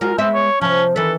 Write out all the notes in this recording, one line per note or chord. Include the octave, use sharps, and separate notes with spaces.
G#3 F4 F#4 A#4
G#3 B3 C4 E5
C#5
C3 F3 C#4
D#3 E3 A4 B4